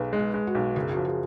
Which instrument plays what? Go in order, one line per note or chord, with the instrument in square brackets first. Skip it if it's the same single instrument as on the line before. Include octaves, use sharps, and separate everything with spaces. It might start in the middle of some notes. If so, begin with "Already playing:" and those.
Already playing: [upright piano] B1 [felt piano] G#4 B4
[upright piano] G#3
[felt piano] G#4
[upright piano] G#3
[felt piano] F#4
[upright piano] B1
[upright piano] F#1 [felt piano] G#4
[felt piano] F#4
[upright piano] F3
[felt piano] G#4